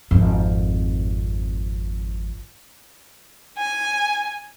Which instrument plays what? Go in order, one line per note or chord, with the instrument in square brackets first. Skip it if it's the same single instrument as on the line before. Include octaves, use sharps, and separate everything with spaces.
[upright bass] G#1 F2
[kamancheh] G#5